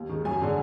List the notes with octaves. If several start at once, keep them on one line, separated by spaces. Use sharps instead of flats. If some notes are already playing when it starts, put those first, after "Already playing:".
Already playing: D#2
D#3 G#3
F#2 G#5
D3 G#3